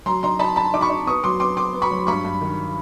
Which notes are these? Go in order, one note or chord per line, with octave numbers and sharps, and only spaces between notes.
F#3 A#5 C6
D#4 A#5 C6
D#4 A5 B5
D#4 A5 B5
D#4 D6
B5 C#6
D#4
B3 C#6 D#6
F#3 C6 D6
B3 C6 D6
B3 C6 D6
B3
B5 C#6
F#3
G2 B5 C#6
G2
D#3